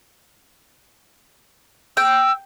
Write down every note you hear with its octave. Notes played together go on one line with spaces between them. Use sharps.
G5 E6